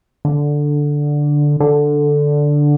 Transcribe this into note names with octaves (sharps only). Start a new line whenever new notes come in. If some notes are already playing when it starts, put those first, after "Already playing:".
D3
D3